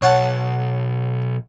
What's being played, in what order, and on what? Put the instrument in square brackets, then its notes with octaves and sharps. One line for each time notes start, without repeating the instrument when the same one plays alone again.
[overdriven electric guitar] B1 [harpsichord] C#5 F#5 A5